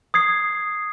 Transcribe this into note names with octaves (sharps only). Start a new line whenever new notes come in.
D#6 G#6 C7